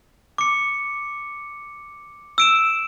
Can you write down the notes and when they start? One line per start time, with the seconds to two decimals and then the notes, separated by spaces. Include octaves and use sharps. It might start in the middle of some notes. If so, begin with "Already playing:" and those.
0.38 D6 C#7
2.38 E6 D7 E7